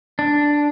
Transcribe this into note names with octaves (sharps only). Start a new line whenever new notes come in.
D4